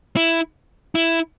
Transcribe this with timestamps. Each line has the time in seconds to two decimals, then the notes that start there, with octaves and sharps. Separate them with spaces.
0.16 E4
0.95 E4